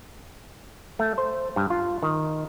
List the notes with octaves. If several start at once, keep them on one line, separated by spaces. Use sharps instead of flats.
A3
C5
G2
F4
D#3